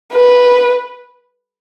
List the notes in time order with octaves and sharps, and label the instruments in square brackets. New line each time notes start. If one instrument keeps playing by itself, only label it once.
[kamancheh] B4